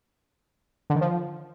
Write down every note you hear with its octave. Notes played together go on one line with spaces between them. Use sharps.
D3
D#3
F3